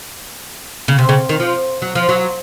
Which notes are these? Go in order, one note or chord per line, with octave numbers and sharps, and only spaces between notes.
C#3
C3
C#3
D#3
F3
F#3
F3
F#3